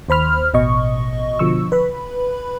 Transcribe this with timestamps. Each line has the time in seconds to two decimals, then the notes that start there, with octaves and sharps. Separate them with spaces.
0.09 D#2 C5 B5 F6
0.54 A1 B2 D#5 C#6
1.39 B2 D3 F3 C#6 E6
1.72 B4 B5